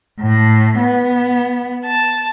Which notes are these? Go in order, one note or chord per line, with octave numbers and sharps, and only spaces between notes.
A2
B3
A5